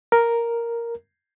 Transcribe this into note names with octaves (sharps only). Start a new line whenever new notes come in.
A#4